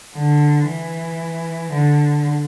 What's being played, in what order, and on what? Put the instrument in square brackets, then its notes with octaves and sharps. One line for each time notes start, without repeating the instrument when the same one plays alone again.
[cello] D3
E3
D3